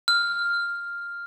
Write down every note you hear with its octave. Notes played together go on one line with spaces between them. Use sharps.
F6